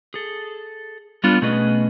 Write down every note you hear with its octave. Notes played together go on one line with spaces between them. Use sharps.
G#4 A4
G3 B3 D4 F4
B2 A3 C#4 G#4 B4 D#5